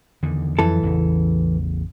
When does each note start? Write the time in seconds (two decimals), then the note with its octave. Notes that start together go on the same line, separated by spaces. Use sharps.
0.23 E2 D3 D#3
0.59 F2 E3 F#3 A4
0.83 A1 E2 C#3